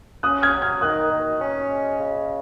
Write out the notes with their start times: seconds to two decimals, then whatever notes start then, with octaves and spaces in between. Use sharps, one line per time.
0.23 C#4 D#6 F#6
0.42 F6 G#6
0.53 F#3
0.62 F6 G#6
0.81 D#3 D#6 F#6
1.10 D#3
1.40 C#4
1.68 G#3
1.98 C#3